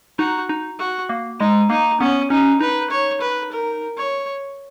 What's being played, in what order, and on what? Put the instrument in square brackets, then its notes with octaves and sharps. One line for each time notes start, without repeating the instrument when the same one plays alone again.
[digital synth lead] D#4 [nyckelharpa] F#4
[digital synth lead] D#4
[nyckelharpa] F#4
[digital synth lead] A#3
[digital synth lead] G#3 [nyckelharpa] D#4
[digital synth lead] A#3 [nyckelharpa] D#4
[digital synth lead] B3 [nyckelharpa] C#4
[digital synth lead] C#4 [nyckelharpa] D#4
[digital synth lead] D#4 [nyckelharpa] B4
[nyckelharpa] C#5
B4
A#4
C#5